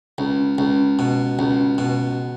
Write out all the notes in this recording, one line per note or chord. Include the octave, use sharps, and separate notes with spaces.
C#2
C#2
B2
C#2
B2